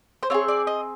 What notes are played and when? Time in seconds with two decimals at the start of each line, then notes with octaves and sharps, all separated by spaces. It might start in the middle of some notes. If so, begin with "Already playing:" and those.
0.23 C5
0.30 C4 F4 C#5
0.34 G#4
0.48 D5
0.67 D#5